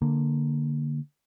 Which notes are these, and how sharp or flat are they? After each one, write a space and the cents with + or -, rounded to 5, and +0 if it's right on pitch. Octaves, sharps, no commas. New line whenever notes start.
D3 +0 A#3 +0